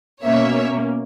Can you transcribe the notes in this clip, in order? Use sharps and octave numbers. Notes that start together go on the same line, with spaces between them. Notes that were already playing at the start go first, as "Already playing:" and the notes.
B2 A#3 C#4 C#5 E5